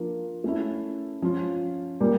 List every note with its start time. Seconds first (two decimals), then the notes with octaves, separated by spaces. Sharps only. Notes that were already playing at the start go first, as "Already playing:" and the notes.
Already playing: F3 A#3 D4 F4 A#4
0.44 A3 C#4 E4
1.22 F3 C#4 F4
2.01 A#2 G3 A#3